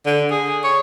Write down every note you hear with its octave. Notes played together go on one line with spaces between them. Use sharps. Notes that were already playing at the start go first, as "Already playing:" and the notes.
D3
G#4
C#5